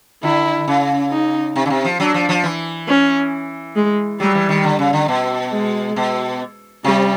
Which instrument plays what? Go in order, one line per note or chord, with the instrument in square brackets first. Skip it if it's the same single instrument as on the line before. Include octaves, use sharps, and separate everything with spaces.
[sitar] D3 [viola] E4
[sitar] C#3
[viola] D#4
[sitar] C3
C#3
C3
F3
[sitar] F#3 [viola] D4
[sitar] F3
F3
E3
[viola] C#4
G#3
[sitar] F#3 [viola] G3
[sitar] E3
D#3
D3
C#3
D3
B2
[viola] G#3
[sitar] B2
[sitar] C3 [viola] G3